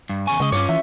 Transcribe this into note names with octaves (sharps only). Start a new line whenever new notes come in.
G2
E2 C#3 G#5 C#6
C#3 G#3 D#5
G2 C#4 F4 C#5 D6
E3 E5